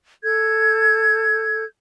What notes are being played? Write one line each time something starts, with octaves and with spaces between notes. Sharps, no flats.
A4 G6 G#6